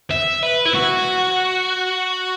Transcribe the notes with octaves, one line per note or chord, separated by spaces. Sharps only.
E5
B4
E4
F#4